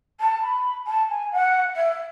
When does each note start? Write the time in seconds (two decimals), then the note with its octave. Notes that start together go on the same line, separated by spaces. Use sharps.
0.19 A5
0.41 B5
0.86 A5
1.09 G#5
1.32 F#5
1.76 E5